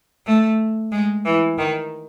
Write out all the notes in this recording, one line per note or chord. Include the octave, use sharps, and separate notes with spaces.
A3
G#3
E3
D#3